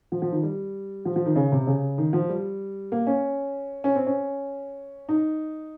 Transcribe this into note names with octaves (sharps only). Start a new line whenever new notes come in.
F3
F3
D#3
G3
F3
F3
D#3
C#3
C3
C#3
D#3
F3
G3
A#3
C#4
C#4
C4
C#4
D#4